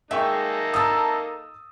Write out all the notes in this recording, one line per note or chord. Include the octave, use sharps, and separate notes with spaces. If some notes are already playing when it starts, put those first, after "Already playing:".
G#3 A#3 D#4 A4 E5 G5 C#6
A#4 A5 D#6 E6 A6